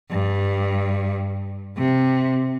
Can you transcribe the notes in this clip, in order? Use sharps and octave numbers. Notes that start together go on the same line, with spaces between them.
G2
C3